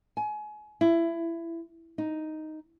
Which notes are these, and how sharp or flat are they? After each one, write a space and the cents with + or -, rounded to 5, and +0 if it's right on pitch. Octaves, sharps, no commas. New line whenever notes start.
G#5 +30
E4 +20
D#4 +0